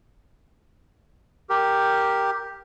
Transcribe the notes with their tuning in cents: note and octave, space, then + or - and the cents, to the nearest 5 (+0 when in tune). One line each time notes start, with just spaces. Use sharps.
G4 +0 A#4 +0